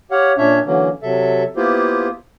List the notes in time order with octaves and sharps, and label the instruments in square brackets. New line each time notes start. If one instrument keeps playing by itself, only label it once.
[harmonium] G4 C#5 F5 F#5
A#2 C#4 D4 C#5 E5
D3 E3 F#3 A#3 C#4
C3 F#3 A4 E5
A#3 B3 E4 F4 G4 C5